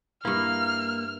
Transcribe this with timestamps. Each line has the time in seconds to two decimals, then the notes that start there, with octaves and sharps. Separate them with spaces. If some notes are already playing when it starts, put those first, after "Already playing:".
0.25 G2 A#3 E4 F6